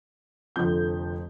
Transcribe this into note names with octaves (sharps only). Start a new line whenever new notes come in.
F1 F2 D3 F3 G6